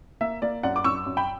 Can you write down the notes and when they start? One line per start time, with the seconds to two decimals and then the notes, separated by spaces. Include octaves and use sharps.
0.21 A#3 E5
0.42 A#3 D5
0.63 F#2 D5 F#5
0.76 D6
0.84 F#2 C#6 E6
1.06 F#2
1.17 G5 B5